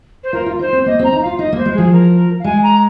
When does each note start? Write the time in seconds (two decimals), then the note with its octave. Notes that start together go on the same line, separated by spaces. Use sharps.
0.23 C5
0.33 F4 A#4
0.46 F4
0.59 D#4 C5
0.72 C4
0.86 A#3 D#5
0.99 C4 A#5
1.12 D#4
1.21 F4 F5
1.39 D#4 D#5
1.52 A#3 C5
1.65 G#3
1.74 F3 G#4
1.92 A#4
2.39 F5
2.44 G#3 G#5
2.62 A#5